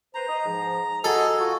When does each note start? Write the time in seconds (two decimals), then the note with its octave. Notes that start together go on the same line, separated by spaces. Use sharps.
0.14 B4 C5 A#5
0.28 D#5
0.45 G#2 F3
1.04 F#4 G#4 A4 D#5
1.39 F4 F#4